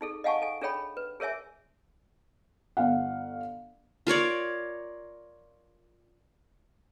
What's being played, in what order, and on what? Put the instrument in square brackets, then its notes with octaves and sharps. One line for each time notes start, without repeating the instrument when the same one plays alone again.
[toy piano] D#4 G#4 A4
D#5 F5 F#5 G#5 A5 C#6
A4 G#5
D4 G#4 A4 C#5 G5 B5
B4
G#4 A#4 C#5 E5 G#5
[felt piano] G1 F5 F#5
[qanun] F4 A#4 C#5 D5